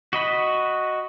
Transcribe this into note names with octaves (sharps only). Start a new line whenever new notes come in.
F#4 D#5 B5